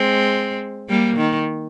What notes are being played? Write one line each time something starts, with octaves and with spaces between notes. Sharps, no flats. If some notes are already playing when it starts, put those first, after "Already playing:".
Already playing: G#3 C4
G3 A#3
D#3